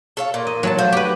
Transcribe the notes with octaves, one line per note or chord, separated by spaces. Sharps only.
A4 C#5 F5
A#2
D#5
F#3 A3 A5
F3
F#4 G4 B4